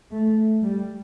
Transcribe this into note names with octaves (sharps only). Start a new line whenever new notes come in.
A3
G3